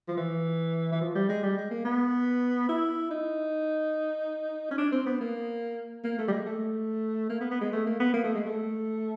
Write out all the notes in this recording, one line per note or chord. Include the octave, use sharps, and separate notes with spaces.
F3
E3
E3
F3
G3
G#3
G3
G#3
A#3
B3
E4
D#4
C#4
D4
C4
B3
A#3
A#3
A3
G3
G#3
A3
A#3
B3
B3
G#3
A3
A#3
B3
A#3
A3
G#3
A3